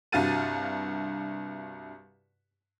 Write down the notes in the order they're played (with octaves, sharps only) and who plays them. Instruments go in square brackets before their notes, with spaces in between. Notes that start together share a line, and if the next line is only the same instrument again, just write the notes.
[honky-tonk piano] C2 G2 F#4 F5 A6 D#7